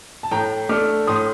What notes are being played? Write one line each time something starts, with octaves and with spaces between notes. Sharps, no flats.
A5
A2 G5 A#5
A3 D4 D6 F6
A2 C6 D#6